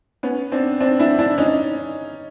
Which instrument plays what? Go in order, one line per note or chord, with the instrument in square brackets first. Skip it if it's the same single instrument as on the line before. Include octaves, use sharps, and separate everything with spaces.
[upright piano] B3 C#4
C4 D4
C4 D4
D4 E4
D4 E4
C#4 D#4